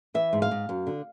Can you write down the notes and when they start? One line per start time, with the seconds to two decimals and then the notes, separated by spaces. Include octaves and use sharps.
0.14 E3 E5
0.33 G#2
0.42 F5
0.51 G#2
0.69 F#2
0.87 D3